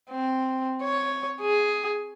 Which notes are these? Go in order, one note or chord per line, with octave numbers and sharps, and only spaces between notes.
C4
C#5
G#4